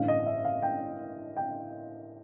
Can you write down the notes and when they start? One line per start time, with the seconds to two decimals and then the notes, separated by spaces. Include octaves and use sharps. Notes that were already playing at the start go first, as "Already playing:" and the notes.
Already playing: A1 G2 D3 F5
0.08 D#5
0.26 E5
0.45 F5
0.62 G5
1.37 G5